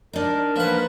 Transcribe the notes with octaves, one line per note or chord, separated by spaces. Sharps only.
D4 D#4 A#4
F3 A#3 B4 F#5